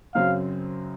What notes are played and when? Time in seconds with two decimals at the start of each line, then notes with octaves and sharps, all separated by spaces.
0.15 F#2 C#3 F#3 C4 F5